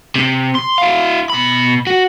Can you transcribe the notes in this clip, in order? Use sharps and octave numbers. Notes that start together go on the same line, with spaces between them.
C3
C6
E4 F5
B2 B5
F#4